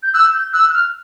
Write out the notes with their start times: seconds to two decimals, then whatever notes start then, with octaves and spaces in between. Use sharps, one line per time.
0.02 G6
0.14 E6 F#6
0.33 G6
0.53 E6 F#6
0.69 F#6
0.73 F6